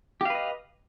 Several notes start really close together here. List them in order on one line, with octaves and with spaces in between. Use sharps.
G4 F5 B4 D#5